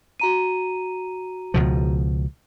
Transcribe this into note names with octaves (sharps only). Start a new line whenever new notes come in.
F#4 A#5 D#7
C#2 B2 F3